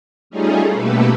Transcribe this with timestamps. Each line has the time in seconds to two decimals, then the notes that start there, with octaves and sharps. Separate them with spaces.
0.30 G3 A3 C#4 D#4 F4 G#4
0.73 B2 A3 A#3 G4 A4 B4